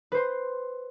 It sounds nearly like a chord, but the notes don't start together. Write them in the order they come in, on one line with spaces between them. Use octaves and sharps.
B4 C5 C6